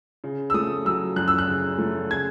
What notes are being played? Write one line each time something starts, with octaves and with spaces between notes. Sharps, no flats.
C#3
E6
A3 D#6
F#3 E6
F#2 F#6
E6
F#6
C#3
A3
C#3 G#6